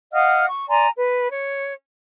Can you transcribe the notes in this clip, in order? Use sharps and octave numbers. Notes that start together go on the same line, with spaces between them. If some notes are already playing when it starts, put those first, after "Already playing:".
D#5 F5 F#5 F6
C#6
D5 G#5 A#5 C6
B4
C#5